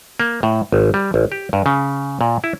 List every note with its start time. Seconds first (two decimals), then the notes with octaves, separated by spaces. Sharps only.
0.20 A#3
0.43 A2
0.72 G#1
0.94 G3
1.14 A1
1.32 G4
1.53 G2
1.66 C#3
2.21 A#2
2.44 E4